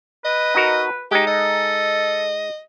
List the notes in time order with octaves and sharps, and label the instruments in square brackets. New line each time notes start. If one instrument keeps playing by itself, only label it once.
[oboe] B4 [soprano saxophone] D#5
[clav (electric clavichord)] D#4 F#4 A#4
[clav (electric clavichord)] G#3 D#4 [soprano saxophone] G4
[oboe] A4 [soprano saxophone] D#5